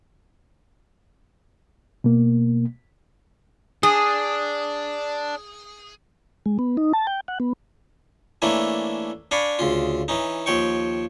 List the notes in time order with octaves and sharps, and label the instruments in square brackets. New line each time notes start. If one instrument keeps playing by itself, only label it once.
[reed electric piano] B2 A#3
[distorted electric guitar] D4 [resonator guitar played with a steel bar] G#4 [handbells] D#6
[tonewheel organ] G#3
B3
D#4
A5
G5
F#5
B3
[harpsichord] E3 A3 A#3 C#4 D4 E4
D4 D5 F5 G#5 B5 C#6
D2 C#3 F4
E3 C#4 D#4
D#2 F3 C#5 G5 C#6